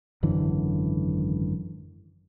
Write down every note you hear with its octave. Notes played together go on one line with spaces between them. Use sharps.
G#1 F#2 D3 E3